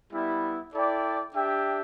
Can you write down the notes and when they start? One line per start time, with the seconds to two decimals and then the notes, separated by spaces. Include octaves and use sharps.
0.11 G3 B3 E4
0.72 E4 A4 D5 G5
1.34 D4 G4 E5 G5